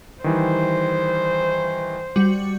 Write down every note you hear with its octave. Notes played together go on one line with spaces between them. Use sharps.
D#3 E3 G3 C5
G3 F#4 C#7